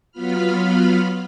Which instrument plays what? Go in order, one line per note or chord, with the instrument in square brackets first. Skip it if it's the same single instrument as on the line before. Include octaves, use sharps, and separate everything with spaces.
[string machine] F#3 B3 F4 B5 F6